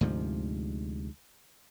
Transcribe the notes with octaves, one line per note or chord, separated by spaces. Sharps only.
D2 G#2 C3 F3